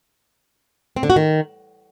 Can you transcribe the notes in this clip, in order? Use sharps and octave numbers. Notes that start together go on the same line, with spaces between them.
C4
D3
F#4
D#3